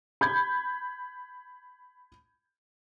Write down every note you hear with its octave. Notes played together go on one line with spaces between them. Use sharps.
B5 G6 G#6